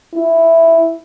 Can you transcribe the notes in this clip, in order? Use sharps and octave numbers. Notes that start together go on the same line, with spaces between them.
E4